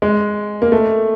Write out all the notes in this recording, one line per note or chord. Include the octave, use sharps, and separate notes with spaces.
G#3
A#3
A3